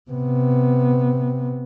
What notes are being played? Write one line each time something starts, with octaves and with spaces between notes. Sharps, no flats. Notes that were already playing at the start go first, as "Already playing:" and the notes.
C3 B3